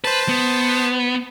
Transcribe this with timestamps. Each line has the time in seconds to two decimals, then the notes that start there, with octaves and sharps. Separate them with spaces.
0.04 B4 C5 A5
0.29 B3